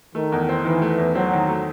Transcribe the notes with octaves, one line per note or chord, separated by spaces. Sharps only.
D#3 A3
E2
C4
D#3 E3
A3
E2
F#3 C4
D#3
A3